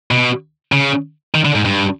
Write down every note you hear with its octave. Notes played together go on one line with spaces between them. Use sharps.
B2
C#3
D#3
D3
G#2
G2